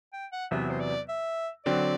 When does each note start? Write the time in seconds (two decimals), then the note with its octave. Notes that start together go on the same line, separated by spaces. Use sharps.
0.13 G5
0.32 F#5
0.51 E2 C3 F#3 B3 E5
0.70 C5
0.80 D5
1.09 E5
1.66 D3 F#3 C4 D5